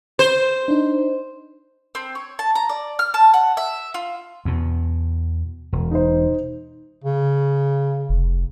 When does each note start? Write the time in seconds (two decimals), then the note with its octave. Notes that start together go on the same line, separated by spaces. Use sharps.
0.19 C5
0.68 D4 D#4
1.95 C4
2.15 C#5
2.39 A5
2.55 A#5
2.69 D5
2.99 F6
3.14 A5
3.34 F#5
3.57 E5
3.94 F4
4.45 E2 B2
5.72 E1
5.91 D#4 C5
7.04 C#3
8.09 F1